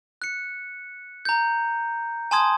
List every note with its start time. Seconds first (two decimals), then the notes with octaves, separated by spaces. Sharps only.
0.22 F#6 C#7
1.25 A#5 G6
2.31 G#5 A5 C6 D#6 G#6